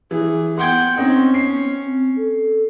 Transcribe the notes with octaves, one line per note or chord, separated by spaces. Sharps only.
E3 G#4
B3 F#5 G5 C6 G#6
C4 C#4 D#4
C7
C4
A4